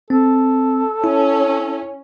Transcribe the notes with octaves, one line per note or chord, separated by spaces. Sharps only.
C4 A4
C#4 E4